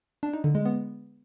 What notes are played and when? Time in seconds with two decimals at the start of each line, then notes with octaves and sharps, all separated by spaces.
0.23 D4
0.33 D#4
0.44 D3
0.55 G#3
0.65 B3